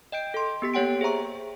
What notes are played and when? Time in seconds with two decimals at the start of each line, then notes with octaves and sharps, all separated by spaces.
0.12 D#5 G5 G6 D7
0.34 A4 C6
0.62 B3 G4 B6
0.74 A#3 G4 C#5 F#5 G5 D7
1.01 G#4 C5 E5 A#5 C#6